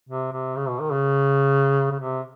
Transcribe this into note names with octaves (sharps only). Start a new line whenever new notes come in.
C3
C3
C#3
B2
D#3
C#3
C#3
C3